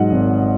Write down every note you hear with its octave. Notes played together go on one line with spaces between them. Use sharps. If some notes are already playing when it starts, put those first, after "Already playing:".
Already playing: G#2 F#3 D#5 F#5
G#1